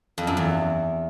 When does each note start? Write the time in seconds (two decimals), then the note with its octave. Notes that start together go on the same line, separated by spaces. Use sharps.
0.18 F2
0.27 F#2
0.37 E2